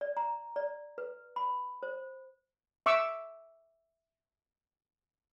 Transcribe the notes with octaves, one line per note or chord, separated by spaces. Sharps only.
D5
A#5
D5
B4
B5
C5
E5 C#6 D6 E6